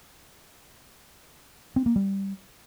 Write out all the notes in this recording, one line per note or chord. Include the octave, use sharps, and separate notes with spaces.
C4
A#3
G3